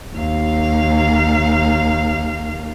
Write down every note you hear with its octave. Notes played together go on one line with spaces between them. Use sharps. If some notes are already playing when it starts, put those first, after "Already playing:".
D#2 F5